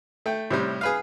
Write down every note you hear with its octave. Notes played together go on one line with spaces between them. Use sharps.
A3 G5
A2 C3 G3
G#4 B4 F5